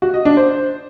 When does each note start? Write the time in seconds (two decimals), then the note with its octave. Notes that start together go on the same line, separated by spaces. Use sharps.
0.02 F#4
0.14 D#5
0.25 D4
0.37 C5